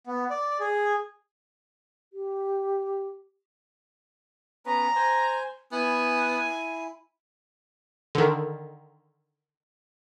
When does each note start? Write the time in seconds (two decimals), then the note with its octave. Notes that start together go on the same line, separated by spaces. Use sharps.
0.07 B3
0.30 D5
0.60 G#4
2.13 G4
4.66 B3 C#4 B4 A#5
4.96 C5 G#5
5.72 B3 E4 G#5
8.15 D3 D#3